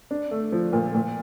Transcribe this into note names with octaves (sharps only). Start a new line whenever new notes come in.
D4
A3
F3
A#2
A#2